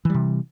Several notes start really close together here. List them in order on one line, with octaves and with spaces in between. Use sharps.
E3 G3 C3